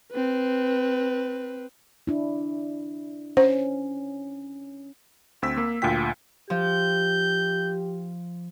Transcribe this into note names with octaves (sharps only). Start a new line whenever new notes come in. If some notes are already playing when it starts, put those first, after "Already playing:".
C4 B4
D4 E4
C#4 C5
D2 C4 E6 B6
A#3
D2 A#2 F4 G5 B6
F3 G4 G6